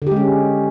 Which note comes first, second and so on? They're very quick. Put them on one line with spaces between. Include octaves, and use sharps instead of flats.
D3 G4 G#3 C#4